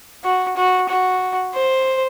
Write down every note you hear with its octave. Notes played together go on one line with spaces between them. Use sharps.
F#4
F#4
F#4
C5